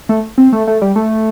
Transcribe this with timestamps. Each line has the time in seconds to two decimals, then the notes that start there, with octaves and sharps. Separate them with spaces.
0.09 A3
0.38 C4
0.53 A3
0.67 A3
0.82 G3
0.96 A3